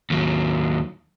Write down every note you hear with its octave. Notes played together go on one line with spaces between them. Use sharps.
D#2 F#3